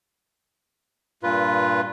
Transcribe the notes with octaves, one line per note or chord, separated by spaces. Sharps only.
G2 A#2 F4 B4